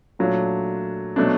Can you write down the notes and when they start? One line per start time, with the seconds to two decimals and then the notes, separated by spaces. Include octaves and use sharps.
0.19 A#2 F#3 A3 D4 F4
1.16 B2 F#3 A3 D4